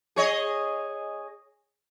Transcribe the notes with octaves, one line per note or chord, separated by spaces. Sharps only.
G#4 C#5 D#5